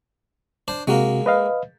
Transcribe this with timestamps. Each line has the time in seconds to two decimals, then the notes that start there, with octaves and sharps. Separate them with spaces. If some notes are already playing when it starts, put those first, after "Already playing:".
0.68 D4 C5
0.87 C3 G#3 A#3 F#4
1.26 B4 D#5 F5